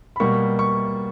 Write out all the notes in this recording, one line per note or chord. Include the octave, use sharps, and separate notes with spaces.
B5
B2 G3 A#3 C#6
C#6